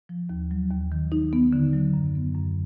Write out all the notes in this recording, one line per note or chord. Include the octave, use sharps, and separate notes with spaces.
F3
D#2
F#3
D#2
D#3
D#4
B3
D3
F#3
F#2
B3
F#2